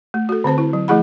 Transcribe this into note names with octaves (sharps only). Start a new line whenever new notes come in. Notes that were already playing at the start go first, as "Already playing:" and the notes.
A3
F#4 A4
D3 C4 C5 A5
E4
F#3
F3 A3 E4 G#4 F#5 B5